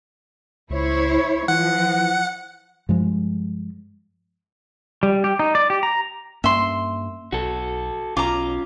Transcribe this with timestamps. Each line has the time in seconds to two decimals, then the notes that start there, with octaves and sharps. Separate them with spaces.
0.70 C#2 E4 C5 C#5
1.48 E3 F3 F#5
2.89 G2 F3 G#3
5.03 G3
5.24 G4
5.39 D#4
5.55 D5
5.70 G4
5.83 A#5
6.44 G2 A#3 C#4 E5 C6
7.32 B1 F#4 A4
8.17 B1 C#4 F4 A#5 D6